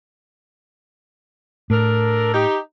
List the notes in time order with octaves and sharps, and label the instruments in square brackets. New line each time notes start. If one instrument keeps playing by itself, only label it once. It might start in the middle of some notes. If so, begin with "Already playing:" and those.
[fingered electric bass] A2 [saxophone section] D4 A4 A#4
[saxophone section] D#4 G4